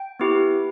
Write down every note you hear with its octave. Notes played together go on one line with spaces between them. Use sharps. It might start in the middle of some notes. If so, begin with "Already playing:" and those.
Already playing: G5
B3 E4 G4